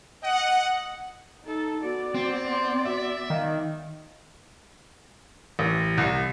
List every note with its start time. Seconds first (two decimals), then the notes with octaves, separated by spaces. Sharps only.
0.23 D#5 F#5
1.45 D#4 A4
1.83 B3 F#4 D5
2.15 C4
2.49 C6
2.85 F#4 E5
3.30 D#3 F5
5.59 A1
5.98 C2